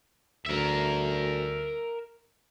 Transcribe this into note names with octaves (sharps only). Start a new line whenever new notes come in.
D2 A#4 E5